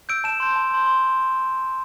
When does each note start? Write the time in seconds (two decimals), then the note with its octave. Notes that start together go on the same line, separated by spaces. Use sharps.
0.09 E6 G6 D7
0.24 A5 E7
0.40 C6 G6
0.56 A5
0.71 C6 G6
0.86 C6